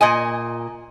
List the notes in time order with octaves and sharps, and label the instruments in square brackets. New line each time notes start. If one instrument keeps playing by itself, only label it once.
[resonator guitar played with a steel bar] A#2 D#5 G#5